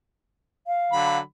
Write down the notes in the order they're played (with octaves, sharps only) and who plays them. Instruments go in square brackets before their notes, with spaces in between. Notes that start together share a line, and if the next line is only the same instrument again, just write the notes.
[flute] F5
[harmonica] D3 F#3 B5